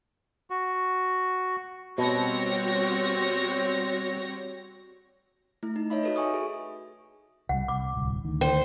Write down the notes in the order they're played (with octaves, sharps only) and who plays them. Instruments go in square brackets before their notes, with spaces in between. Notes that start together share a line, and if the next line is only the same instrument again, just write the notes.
[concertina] F#4
[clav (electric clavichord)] B2 [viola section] G3 C4 F#4 [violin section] C#5 A#6
[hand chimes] A3 E4
D#4
D#4 C#5 D#5 E5 B5
F#4 A4 B4
E5 G#5 C#6 D#6
G#4
[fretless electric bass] C2 G3 [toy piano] F#5
[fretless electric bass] C2 [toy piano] D6
[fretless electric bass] D1 C2
D2 D#3
[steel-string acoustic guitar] C5 [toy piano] G5